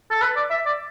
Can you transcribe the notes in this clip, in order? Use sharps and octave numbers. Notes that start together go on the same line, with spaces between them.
A4
B4
D5
E5
D5